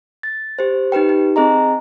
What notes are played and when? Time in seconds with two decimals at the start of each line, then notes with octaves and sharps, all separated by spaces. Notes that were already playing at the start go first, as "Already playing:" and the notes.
0.23 A6
0.59 G4 C5
0.92 D#4 G4 B4 G5
1.09 D#4
1.36 C4 G#4 D#5 A#5